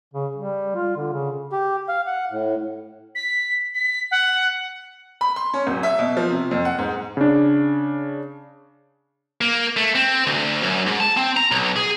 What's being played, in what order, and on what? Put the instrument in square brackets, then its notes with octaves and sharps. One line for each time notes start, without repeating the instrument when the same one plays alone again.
[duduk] C#3
G3
F4
D3
C#3
[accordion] G4
F5
F#5
A2
[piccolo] B6
B6
F#5
[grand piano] B5
C6
C#4
D1
E5
B2
F3
C3
F2
F#5
G#2
[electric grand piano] C#3 D4
[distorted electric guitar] A#3
A3
C4
D2
F#2
G#2
A5
C4
A#5
B1
G#4